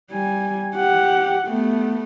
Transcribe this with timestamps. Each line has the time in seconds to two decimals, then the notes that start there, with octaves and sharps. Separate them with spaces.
0.11 G3 G#5
0.76 G4 F#5
1.48 A3 B3